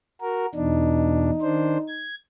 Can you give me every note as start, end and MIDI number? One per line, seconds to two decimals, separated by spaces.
0.21 0.46 66
0.21 0.46 70
0.55 1.30 40
0.55 1.30 47
0.55 1.30 62
0.55 2.07 63
1.42 1.78 51
1.42 1.78 62
1.42 1.78 72
1.88 2.15 92